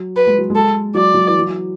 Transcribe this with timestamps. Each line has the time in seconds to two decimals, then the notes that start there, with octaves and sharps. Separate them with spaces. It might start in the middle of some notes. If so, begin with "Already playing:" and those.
Already playing: F#3
0.17 B4
0.27 G#3
0.38 F#3
0.50 G#3
0.55 A4
0.94 F#3 D5
1.14 F#3
1.28 E3
1.39 F#3